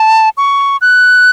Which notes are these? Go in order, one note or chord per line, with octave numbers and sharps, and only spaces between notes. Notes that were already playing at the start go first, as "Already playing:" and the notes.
Already playing: A5
C#6
F#6